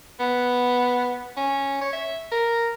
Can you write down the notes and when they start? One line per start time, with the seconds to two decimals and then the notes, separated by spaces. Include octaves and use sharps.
0.20 B3
1.37 C#4
1.81 C#5
1.93 E5
2.32 A#4